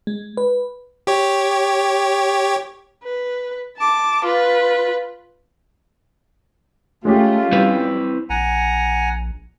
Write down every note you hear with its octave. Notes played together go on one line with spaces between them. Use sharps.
G#3
B4
G4 C#5
B4
A5 D6
F4 B4
G#3 A3 C#4 F4 G4
G3 C4 E4 B4
A#1 F#5 G#5 A#5